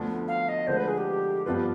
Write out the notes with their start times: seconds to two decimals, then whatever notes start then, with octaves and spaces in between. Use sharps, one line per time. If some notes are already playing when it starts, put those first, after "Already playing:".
Already playing: D2 D3 F3 B3
0.28 F5
0.48 D#5
0.67 D2 D3 F3 G#3 C5
0.77 B4
0.88 G#4
0.97 G4
1.46 G2 F3 B3 F4 G4 B4